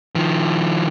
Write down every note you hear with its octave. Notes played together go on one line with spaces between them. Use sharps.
D#3 F3